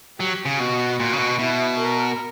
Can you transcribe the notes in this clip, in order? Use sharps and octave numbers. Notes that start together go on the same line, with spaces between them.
F#3 G4
C#3
B2 F#4
A#2
C#3
B2
B2 E4
A#4